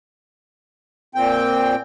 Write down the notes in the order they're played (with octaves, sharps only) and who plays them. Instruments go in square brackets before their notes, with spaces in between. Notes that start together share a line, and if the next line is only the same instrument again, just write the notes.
[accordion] A#2 C4 G5